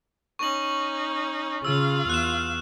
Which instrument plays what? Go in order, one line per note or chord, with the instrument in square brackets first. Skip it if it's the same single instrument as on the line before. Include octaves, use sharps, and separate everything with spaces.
[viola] C#4 D#4 [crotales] C#6 F#7
[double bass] C#3 [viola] F4 F5 [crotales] E6
[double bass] E2 [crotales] F#6 E7